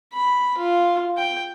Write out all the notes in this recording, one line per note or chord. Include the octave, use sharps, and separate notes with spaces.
B5
F4
G5